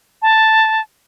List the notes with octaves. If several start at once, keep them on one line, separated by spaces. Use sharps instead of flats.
A5